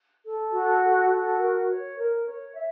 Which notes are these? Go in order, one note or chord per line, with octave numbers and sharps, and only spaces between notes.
A4
F#4
A4
F#4
A#4
C#5
A#4
C#5
E5